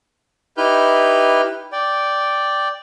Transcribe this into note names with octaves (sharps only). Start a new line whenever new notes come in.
D#4 E4 G4 B4 F6 G6
D5 G5